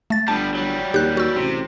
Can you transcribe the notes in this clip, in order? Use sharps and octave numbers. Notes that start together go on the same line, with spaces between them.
A3 A6
G1 G3 B3 A5
F#3 G3
D#2 G4 F#6
F#4 E6
A1 C3